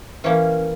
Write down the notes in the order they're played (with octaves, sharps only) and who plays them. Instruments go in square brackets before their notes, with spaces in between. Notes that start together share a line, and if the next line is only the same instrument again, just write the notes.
[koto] E3 A#3 C#4